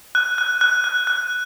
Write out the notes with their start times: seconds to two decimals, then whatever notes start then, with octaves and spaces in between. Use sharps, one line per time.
0.15 F#6
0.38 F#6
0.61 F#6
0.84 F#6
1.07 F#6